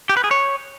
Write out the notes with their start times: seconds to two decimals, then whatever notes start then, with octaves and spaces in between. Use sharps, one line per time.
0.09 G4
0.17 B4
0.24 G#4
0.31 C#5